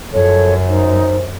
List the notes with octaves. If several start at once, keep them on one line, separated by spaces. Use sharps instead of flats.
F#2 F3 A4 C#5
D#4 C5